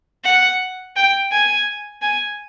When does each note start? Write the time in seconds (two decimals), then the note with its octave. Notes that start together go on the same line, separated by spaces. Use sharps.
0.24 F#5
0.96 G5
1.31 G#5
2.02 G#5